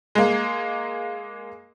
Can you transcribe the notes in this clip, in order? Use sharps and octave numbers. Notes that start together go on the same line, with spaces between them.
G#3 A#3